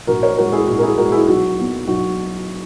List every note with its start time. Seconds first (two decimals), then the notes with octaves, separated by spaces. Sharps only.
0.07 A#1 F#4 A#4
0.23 A#4 C#5
0.37 A#2 G#3 F#4 A#4
0.52 E4 G#4
0.67 A#1 F#4
0.78 A#4
0.83 E4 G#4
0.97 A#2 G#3 F#4 A#4
1.12 E4 G#4
1.27 B1 F#4
1.58 A#2 F#3 B3
1.88 B1 F#4